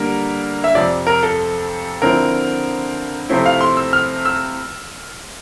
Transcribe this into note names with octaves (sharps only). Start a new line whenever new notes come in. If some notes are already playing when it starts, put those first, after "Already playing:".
Already playing: D3 G3 A#3 A#4
E5
F2 C3 F3 D5
A#4
A4
D3 F3 C4 E4 A#4
C3 F3 A3 C4 E4
F5
C6
E6
F6
E6